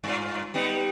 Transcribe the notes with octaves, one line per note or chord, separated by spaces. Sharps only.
G2 F4
G3 B3 D#4